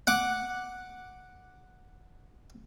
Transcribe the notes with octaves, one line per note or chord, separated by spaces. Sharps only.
F#5 D6